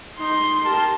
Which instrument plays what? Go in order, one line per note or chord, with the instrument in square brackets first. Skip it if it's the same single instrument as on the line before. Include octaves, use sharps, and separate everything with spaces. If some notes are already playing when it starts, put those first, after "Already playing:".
[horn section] D#4 [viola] C6
[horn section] G4 A#4 A5